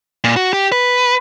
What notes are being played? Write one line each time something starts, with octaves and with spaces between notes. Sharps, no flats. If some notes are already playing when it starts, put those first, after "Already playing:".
A#2
F#4
G4
B4